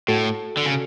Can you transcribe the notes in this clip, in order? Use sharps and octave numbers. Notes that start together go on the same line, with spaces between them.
A2 F#4 A4
D3
C#3